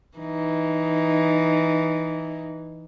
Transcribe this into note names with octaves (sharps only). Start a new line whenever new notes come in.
E3 D#4